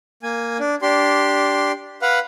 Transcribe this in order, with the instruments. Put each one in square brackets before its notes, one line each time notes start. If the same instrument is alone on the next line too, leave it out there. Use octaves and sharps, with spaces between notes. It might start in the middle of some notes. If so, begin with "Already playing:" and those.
[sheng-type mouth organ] A#3 G#5
D4
D4 G4 C6
B4 F5 F#5